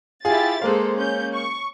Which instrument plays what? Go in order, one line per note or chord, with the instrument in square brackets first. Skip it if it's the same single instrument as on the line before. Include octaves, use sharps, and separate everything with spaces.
[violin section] E4 G4 A6 [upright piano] F4 G#4
[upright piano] G#3 A#3 F5 [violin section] A4 C5
[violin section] C#4 G6
C#6